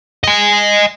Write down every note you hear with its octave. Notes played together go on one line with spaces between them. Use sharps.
D#5 G#5